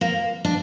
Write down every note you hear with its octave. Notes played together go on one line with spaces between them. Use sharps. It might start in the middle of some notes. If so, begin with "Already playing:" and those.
A#3
D4